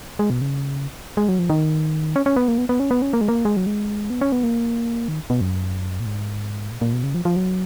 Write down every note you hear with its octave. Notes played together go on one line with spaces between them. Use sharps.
G#3
B2
C#3
G#3
F#3
F3
D#3
C#4
C#4
B3
A#3
B3
B3
C#4
B3
C#4
A#3
G#3
A#3
G#3
F#3
G#3
B3
C#4
B3
A#3
D#3
B2
F#2
A#2
G#2
A#2
A#2
B2
C#3
F3
F3
F#3